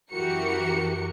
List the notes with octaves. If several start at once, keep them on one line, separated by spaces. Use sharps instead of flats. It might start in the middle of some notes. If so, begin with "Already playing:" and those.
F#2 E3 F#4 G4 A#4 C#7